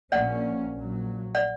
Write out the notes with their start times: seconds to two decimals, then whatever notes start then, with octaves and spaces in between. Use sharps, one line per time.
0.12 A#1 A#2 A#3 C#4 D5 F#5
0.73 A#1 A#2 F#3
1.35 D5 F#5